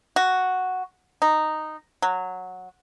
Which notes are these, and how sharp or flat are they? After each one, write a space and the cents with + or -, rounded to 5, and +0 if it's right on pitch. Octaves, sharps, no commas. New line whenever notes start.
F#4 +0
D#4 -10
F#3 -10